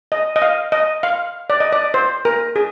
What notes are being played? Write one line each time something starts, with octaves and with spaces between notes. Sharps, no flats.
D#5
D#5
F5
D#5
F5
D5
D#5
D5
C5
A#4
G#4